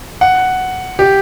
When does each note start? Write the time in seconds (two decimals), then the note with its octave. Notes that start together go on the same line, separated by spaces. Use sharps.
0.21 F#5
0.99 G4